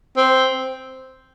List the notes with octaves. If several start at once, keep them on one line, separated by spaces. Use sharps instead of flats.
C4